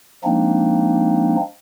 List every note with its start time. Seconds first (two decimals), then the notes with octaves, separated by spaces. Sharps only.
0.24 F3 G#3 A#3 C4 D4 D#4